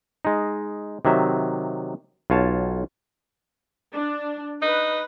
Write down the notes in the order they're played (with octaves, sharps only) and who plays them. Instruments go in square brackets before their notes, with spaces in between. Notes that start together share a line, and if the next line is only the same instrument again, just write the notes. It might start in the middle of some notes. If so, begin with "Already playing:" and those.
[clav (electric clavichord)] G#3 D#4
C3 D#3 F#3 E5
B1 F4 C#5 A5
[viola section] D4
[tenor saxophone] D#4 [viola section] B4